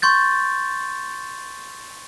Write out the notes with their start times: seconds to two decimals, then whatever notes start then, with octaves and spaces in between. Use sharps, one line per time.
0.02 C6 C#6 G6 A6